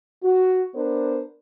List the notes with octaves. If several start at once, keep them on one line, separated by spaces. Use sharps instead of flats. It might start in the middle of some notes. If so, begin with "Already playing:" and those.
F#4
B3 D4 A#4 C5